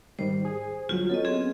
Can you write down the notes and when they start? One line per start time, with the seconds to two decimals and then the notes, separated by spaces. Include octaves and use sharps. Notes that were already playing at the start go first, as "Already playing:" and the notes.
0.19 G#2 D#3 G3 C5
0.45 G#4
0.89 G1 F#3 F4
1.10 F#3 B3 C#4 A4 D#5
1.25 C4 G#4